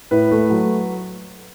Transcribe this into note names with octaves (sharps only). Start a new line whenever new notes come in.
A2 B4
A3
F#3